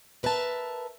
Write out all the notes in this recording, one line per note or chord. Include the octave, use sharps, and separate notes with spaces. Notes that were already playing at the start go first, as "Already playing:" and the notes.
A#4 B4 E5 G5 A5